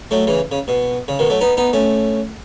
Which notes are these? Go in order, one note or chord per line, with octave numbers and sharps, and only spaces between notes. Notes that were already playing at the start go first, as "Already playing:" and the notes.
F#3 A3
C#3 E3
C#3
B2
C#3
B2 D#3
F#3 A3
B3 D#4
B3 D#4
A3 C#4